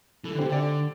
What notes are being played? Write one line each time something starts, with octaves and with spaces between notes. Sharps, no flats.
E3 A4
D3
C3 G4 C5
D3 A4 D5